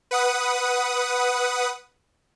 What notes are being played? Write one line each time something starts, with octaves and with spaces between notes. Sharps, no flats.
B4 F#5 D#6